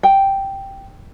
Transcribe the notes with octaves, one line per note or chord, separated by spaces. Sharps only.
G5